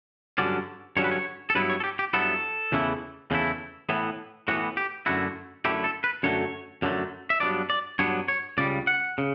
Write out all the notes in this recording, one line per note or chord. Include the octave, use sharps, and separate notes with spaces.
G2 D3 F#3 C#4 D5
G2 D3 F#3 C#4 C#5
B4
C#5
A4
G2 F#3 B3 E4 B4
C#5
A4
G4
G4
G2 F#3 B3 E4 A4
E2 C#3 E3 A3 E4
E2 C#3 E3 A3 E4
A2 E3 B3
A2 E3 B3 F#4
G4
F#2 D3 A3 E4 F#4
F#2 D3 A3 E4 G4
A4
B4
F#2 D3 F#3 A3 C#5
F#2 D3 F#3 A3
E5
G2 F#3 B3 D4 D5
D5
G2 F#3 B3 D4 C#5
C#5
C#2 C#3 G3 D5
F#5
C#3